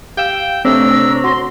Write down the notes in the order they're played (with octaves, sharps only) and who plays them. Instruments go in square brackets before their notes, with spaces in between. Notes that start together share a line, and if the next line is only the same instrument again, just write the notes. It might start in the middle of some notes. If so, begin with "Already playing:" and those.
[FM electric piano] G4 F5 E6 [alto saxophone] G5
[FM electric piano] C3 A3 [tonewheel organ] C4 C#5 A#5 [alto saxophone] D4 [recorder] E6
[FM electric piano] F#4 [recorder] C6